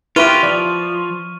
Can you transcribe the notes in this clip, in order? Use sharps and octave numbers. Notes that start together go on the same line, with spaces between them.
E4 F4 G4 B4 C#6 F6 D#7
F3 D5